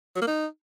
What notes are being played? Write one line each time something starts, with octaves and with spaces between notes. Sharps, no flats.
F#3
A#3
D#4